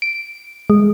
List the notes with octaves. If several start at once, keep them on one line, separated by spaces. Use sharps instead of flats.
D7
G#3